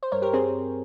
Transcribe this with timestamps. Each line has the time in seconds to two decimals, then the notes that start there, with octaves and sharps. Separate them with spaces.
0.03 C5
0.11 G2 A#4 C#5
0.22 G4 A#4
0.33 C4 G#4 C5